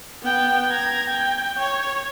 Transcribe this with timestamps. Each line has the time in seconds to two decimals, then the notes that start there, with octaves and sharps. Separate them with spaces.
0.23 B3 G5
0.70 A#5 G#6
1.10 G5
1.59 C#5